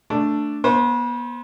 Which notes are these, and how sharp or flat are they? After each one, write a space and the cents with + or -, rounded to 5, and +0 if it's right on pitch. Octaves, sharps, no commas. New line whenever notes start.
A3 +10 D4 +0
B3 -35 C5 +0